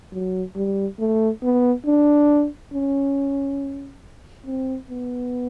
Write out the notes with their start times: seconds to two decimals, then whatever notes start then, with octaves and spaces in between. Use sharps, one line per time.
0.13 F#3
0.56 G3
0.99 A3
1.42 B3
1.86 D4
2.73 C#4
4.46 C4
4.90 B3